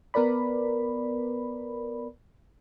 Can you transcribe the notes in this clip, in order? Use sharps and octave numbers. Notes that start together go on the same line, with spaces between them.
B3 A#4 B4 D5 B5